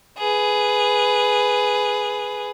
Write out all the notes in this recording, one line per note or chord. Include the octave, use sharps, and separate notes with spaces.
G#4 B4